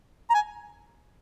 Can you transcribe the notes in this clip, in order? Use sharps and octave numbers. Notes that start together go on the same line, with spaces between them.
A#5
G#5